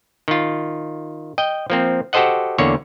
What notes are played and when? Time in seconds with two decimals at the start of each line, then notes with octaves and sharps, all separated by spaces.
0.28 D#3 F4
1.38 D#5 G5
1.70 F3 A#3 C4
2.13 F#4 G4 A4 C5 D#5 F#5
2.58 E2 D3 A#3 C#5